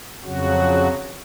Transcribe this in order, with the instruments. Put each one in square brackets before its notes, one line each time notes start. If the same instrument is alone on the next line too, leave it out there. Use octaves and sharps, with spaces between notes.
[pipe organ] F2 C#3 F#3 F#4